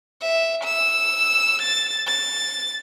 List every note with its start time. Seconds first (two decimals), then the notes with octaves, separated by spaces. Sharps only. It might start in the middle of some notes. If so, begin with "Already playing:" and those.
0.22 E5
0.64 E6
1.62 A6
2.07 A6